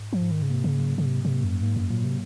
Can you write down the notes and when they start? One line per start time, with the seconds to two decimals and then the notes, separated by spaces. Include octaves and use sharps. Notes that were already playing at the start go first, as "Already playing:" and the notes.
Already playing: G#2
0.13 F3
0.21 G#2
0.31 D#3
0.42 C#3
0.50 C3 A#3
0.64 C#3
0.78 F#3
0.98 C#3
1.05 G#2 C3
1.25 C3
1.34 A#3
1.44 F#2
1.62 G#2 A#3
1.76 F#2
1.90 A#2 F#3
2.04 C3